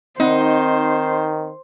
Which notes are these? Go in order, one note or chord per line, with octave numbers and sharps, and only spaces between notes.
D#3 C4 D#4 C5 F#5